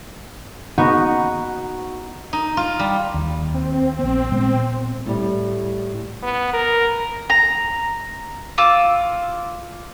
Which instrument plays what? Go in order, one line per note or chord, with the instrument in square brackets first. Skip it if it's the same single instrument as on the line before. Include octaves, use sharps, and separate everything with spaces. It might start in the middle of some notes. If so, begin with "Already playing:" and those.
[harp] B3 D#4 F#4
[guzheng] D#4
F4
G3
[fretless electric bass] D#2
[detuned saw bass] C4
[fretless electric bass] A#1 B3
A#2 G#3 B3
[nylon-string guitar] A2 G3
[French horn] B3
A#4
[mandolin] A#5
F4 D6 E6